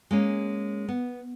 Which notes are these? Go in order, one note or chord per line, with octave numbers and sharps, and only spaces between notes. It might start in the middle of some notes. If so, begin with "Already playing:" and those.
G#3 A#3 C#4
B3